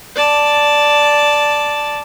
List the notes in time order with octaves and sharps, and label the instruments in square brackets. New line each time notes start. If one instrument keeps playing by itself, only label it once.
[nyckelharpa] D5 A5